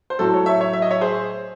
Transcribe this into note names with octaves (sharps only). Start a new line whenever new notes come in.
C5
A2 F#3 F#4 A4
A4 C#5
C#5 E5
C#5 E5
E5
D#5
C#5 E5
G#4 C5